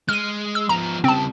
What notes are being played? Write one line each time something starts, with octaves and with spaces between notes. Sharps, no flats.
G#3 F6 D#7
E6
F3 B3 A#5
C#3 G3 C4 A5